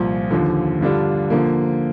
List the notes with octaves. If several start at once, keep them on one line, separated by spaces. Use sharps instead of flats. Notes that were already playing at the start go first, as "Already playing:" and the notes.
Already playing: C2 A#2 F3
D#2 D3 F3
G2 D3 G3 D4 F4
D3 F3 A#3